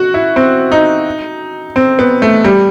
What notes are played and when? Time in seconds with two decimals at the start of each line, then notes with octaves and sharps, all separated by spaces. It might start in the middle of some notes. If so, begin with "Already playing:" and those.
Already playing: F#4
0.14 E4
0.36 C4
0.72 D#4
1.76 C4
1.99 B3
2.22 A3
2.44 G3